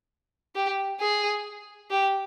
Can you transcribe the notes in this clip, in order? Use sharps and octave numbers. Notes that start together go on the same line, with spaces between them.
G4
G#4
G4